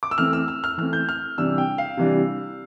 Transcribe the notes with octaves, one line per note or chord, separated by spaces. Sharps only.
D6
E6
E3 A3 C4 F6
E6
E6
F6
E3 A3 C4 F6
G6
F6
C3 E3 G3 D4 E6
G5
F5
C3 E3 G3 D4